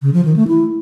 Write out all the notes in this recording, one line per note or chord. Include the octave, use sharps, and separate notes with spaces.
C#3
F3
D#3
A3
E4